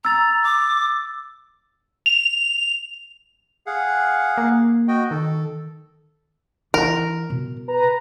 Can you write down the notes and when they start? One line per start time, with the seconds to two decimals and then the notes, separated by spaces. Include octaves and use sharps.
0.05 A#5 E6 A6
0.43 D6
2.06 F7
3.66 G#4 F5 F#5
4.37 A#3
4.88 F#4 D#5 G5
5.11 D#3 A4
6.74 E3 E4 A#4
7.30 B2
7.68 B4 A#5